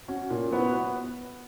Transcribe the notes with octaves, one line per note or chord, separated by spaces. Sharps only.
C#4 F#4
A#2
F#3 B3 E4 B4
B3